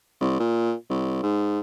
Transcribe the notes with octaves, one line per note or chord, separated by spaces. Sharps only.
C2
A#2
C2
G#2